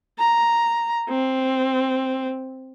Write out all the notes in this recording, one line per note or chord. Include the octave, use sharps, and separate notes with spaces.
A#5
C4